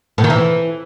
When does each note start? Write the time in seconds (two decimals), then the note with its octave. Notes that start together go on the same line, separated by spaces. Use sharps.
0.18 A2
0.24 D#3
0.30 E3